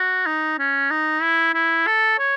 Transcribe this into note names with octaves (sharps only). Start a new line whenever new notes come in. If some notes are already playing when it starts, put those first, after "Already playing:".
Already playing: F#4
D#4
C#4
D#4
E4
E4
A4
C#5